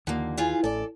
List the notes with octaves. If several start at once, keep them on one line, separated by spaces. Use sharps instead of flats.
D#2 D3 F3 A#3
E3 F4 G#4
A1 A4 D5